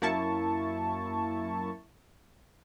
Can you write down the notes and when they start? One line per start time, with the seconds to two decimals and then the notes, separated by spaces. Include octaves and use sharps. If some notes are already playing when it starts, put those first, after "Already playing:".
0.02 F#2 A#3 E4 A5 C#6